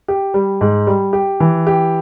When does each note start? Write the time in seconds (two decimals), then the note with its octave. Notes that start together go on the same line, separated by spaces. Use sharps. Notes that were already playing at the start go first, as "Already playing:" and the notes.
0.08 G4
0.34 G3
0.61 G#2
0.87 G3
1.13 G4
1.40 E3
1.67 G4